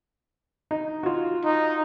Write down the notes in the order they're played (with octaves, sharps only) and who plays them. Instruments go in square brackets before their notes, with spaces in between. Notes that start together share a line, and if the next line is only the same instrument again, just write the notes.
[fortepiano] D#4
F4 F#4
[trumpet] D#4